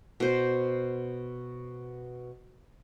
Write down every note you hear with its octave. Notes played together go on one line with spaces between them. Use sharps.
B2 C5